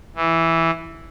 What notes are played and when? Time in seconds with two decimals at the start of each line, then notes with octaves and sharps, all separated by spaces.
0.16 E3